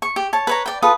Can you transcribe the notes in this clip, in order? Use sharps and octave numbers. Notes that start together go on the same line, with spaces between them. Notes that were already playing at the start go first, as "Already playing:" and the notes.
C#6
G4
C#5 A5
B4 C#5 A#5
D5 G5
F4 A4 B4 D#6